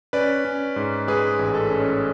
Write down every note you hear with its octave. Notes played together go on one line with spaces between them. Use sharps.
C#4 B4 D5
C#4
G#2
G#3 G#4 B4
A1
A4
C#4